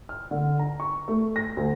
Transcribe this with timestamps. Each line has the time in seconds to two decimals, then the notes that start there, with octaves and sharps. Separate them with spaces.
0.09 F6
0.31 D3
0.59 A#5
0.80 C#6
1.08 A3
1.36 A#6
1.57 D2